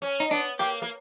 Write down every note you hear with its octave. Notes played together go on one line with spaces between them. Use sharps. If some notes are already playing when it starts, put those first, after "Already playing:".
C#4
D#4
B3 D4
A#3 G4
A#3